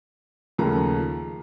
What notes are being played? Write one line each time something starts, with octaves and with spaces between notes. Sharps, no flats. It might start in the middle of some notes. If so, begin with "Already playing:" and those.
D#2 C#3 F3 A3 A#5